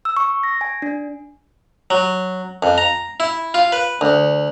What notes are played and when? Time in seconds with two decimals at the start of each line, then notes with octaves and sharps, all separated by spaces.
0.05 E6
0.17 C#6
0.43 A#6
0.61 G#5
0.82 D4
1.90 F#3
2.63 F2
2.78 A#5
3.20 E4
3.54 F4
3.72 B4
4.01 D2